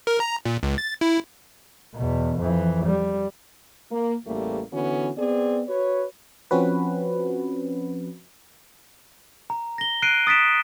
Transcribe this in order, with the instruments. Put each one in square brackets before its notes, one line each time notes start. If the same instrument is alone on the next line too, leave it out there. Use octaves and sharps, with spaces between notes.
[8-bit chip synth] A#4
A#5
A#2
C#2
A6
E4
[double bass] E2 B2
F2 E3
G3
[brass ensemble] A#3
A1 E2 G3 A3 A#3
D3 E3 B3 C#4 F#4
B3 C4 G#4 D5
F#4 B4 C#5
[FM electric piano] F3 C4 C#4 F#4 B4
[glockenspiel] A#5
A#6 G7
F#6 C7 D7 D#7
D#6 A6 B6 D7 E7